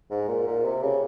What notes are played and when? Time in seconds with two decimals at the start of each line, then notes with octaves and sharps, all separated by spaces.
0.10 G#2
0.28 A#2
0.47 A#2
0.65 C3
0.83 C#3